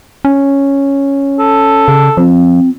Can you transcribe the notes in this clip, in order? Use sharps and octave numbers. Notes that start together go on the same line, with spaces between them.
C#4
A4
C#3
F3 C4